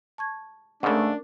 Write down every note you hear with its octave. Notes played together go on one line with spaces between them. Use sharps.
A5 C#6 G#6
G#2 C#3 A3 C#4 D4 A#4